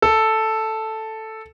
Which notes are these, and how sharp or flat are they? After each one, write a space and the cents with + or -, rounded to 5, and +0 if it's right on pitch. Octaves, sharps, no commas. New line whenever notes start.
A4 +0